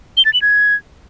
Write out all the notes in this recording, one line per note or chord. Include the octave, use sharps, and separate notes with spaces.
G7
A6
F#7
G#6